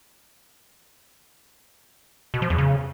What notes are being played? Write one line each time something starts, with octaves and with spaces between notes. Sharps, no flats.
B2
F3
E2
C#3